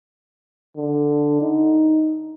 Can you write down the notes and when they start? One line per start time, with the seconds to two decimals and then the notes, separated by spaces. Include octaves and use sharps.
0.76 D3
1.42 D#4